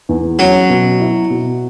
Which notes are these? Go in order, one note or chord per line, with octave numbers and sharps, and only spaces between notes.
E2
F#3 C#4
B2
E4
B2